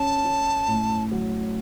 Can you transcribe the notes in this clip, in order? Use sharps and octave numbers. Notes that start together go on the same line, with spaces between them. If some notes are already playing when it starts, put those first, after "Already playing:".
Already playing: C#4 A5
C#4
A2
F#3